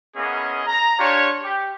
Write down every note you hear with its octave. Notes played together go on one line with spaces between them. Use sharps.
A#3 B3 C#4 E4 G#4 D#5
A#5
D4 F4 G4 C#5
G4